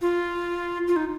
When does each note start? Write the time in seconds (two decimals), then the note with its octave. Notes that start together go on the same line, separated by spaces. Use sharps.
0.01 F4
0.87 F4
0.96 D#4